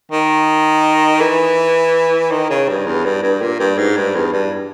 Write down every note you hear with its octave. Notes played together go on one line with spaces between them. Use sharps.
D#3
E3
D#3
C#3
G2
E2
G2
G2
A#2
G2
G#2
G2
E2
G2